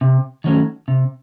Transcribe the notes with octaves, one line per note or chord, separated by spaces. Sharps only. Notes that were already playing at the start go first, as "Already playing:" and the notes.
C3
D#3 F#3 A3 C#4
C3